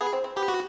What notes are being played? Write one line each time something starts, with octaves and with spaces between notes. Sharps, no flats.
B3 G#4
C4
C4
B3 G4
F#4